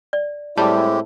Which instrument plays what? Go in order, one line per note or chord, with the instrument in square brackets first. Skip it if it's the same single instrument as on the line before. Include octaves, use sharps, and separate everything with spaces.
[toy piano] D5
[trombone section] A2 C4 E4 [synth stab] G3 [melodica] G#3 G4 [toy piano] A5